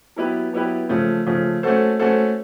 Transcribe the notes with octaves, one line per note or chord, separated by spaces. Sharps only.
F#3 B3 E4 G4 B4
F#3 B3 E4 G4 B4
C#3 F3 A3
C#3 F3 A3
A3 C#4 F#4 A4 C5
A3 C#4 F#4 A4 C5